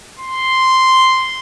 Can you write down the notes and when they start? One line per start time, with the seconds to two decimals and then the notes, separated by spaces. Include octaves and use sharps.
0.19 C6